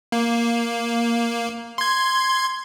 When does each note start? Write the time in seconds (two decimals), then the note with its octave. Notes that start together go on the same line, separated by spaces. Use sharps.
0.12 A#3
1.78 C6 G#6